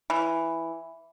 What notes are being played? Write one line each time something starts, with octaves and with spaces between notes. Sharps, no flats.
E3